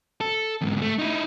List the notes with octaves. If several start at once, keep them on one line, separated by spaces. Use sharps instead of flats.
A4
E2 G#2
A3
D#4 E4